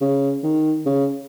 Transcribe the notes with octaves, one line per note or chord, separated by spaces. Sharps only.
C#3
D#3
C#3